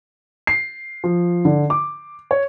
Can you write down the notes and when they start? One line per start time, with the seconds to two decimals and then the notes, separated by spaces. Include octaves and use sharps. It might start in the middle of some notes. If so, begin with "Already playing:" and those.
0.47 C7
1.04 F3
1.45 D3
1.70 D6
2.31 C#5